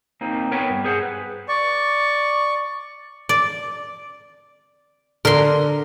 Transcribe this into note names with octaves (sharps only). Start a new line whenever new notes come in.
A#3 C4 D#4
B3 A#4 B4 C#5 G5
G2
G#4 C5 F#5
B4
D5 C#6
D5
D3 A#4 C6